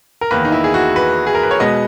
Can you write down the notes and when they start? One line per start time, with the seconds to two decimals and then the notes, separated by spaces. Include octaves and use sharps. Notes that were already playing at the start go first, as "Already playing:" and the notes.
0.21 A#4
0.31 E2 D#3 A#3 B4
0.45 D#4
0.52 E4
0.64 G#4
0.74 F#4
0.96 B4
1.27 G#4
1.35 A#4
1.43 B4
1.51 C#5
1.60 B2 G#3 B3 D#5